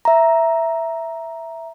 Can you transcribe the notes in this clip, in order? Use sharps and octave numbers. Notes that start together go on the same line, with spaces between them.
E5 A#5